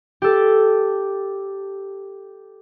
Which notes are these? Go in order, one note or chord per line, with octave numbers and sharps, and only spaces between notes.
G4 A4